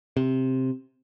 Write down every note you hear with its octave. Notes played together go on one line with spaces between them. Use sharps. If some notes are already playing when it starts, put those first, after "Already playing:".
C3